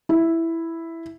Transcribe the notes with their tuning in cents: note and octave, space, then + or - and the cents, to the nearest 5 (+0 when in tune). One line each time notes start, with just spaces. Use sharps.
E4 +0